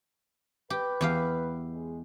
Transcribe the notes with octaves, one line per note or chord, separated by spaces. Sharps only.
G4 B4
E2 G4 F5
G#3